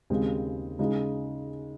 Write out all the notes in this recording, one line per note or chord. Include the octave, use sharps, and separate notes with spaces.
D#2 C#3 G#3 C4
C#3 G#3 D#4